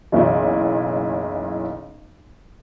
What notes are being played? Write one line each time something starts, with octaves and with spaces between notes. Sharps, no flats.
F#1 B1 E3 E4